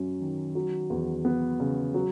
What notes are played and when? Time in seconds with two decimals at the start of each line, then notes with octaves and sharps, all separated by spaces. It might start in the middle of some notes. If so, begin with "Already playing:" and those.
Already playing: F#2 F#3 C#4
0.20 D#3
0.55 F#3
0.90 E2
1.25 B3
1.60 C#3
1.94 F#3